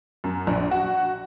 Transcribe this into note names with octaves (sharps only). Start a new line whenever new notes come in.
F#2
A#1
F#4